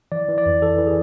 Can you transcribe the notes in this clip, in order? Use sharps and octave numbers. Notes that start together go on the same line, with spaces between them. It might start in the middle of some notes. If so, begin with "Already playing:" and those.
E3 D5
E3
D5
F2
E3 A4
E3
G#4